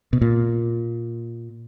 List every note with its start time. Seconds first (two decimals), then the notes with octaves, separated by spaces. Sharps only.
0.13 B2
0.22 A#2